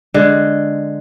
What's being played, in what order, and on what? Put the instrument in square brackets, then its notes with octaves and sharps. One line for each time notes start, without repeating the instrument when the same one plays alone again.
[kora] D3 G#3